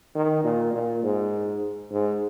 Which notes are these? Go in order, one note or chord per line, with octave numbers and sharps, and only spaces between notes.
D#3
A#2
A#2
G#2
G#2